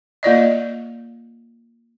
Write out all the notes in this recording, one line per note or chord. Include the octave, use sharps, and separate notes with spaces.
A#3 F4 D5 D#5